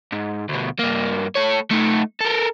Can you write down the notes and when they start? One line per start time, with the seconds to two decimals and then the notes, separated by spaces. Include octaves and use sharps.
0.12 G#2
0.49 D2 B2
0.79 G2 A#3
1.36 A3 C#5
1.71 A3 D#4
2.21 A4 A#4